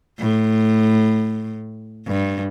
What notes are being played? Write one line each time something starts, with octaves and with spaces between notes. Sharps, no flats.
A2
G2